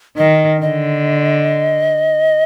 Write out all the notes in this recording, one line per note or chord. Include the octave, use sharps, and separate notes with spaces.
D#3 D#5
D3 D#5